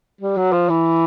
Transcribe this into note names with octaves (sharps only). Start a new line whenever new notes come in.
G3
F#3
F3
E3